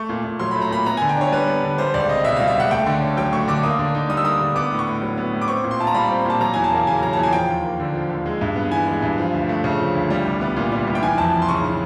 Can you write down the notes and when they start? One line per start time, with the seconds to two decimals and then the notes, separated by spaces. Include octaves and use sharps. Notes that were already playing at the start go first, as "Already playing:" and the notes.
Already playing: A3 C#6
0.09 A#2
0.24 A#2
0.39 F#3 C6
0.51 A3 B5
0.62 A#5
0.71 A#2 B5
0.86 B3 A#5
0.97 D3 G#5
1.09 G5
1.17 D4 C#5
1.32 G3 B4
1.48 B3
1.63 D3
1.78 G3 C5
1.94 C#2 D5
2.09 C4 D#5
2.25 B2 E5
2.36 G3 F5
2.48 E5
2.56 C#2 F#5
2.71 A3 G5
2.86 D3
3.02 C#4
3.17 F#3 G5
3.33 A3 C#6
3.48 D3 D6
3.63 A#3 D#6
3.79 D3
3.95 D#4
4.09 G3 D#6
4.17 E6
4.25 A#3 D#6
4.41 D3
4.56 B3 D6
4.71 A2
4.79 C#6
4.87 A2
5.02 F#3
5.17 B3
5.33 A2
5.42 D6
5.48 C4 C#6
5.64 A#2
5.71 C6
5.79 F4 A5
5.87 A#5
5.94 G3 B5
6.10 C4
6.25 A#2 A5
6.41 F#3 A#5
6.54 E2 G#5
6.64 A5
6.72 A#3
6.87 C#3 G#5
7.02 F#3 A#5
7.13 E2 A5
7.23 G#5
7.33 F3 G5
7.49 D#2
7.63 A#3
7.80 D3
7.95 F3
8.10 D#2
8.26 G#3
8.41 G2
8.56 B3
8.72 E3 G#5
8.87 G#3
9.02 G2
9.18 F3
9.34 D2
9.49 A3
9.64 C#3
9.80 F3
9.95 D2
10.10 G3
10.25 C2
10.41 B3
10.56 A#2
10.72 G3
10.88 C2
10.95 G5
11.03 E3 G#5
11.18 F2 A5
11.33 F2
11.42 C6
11.49 C#3 C#6
11.64 E3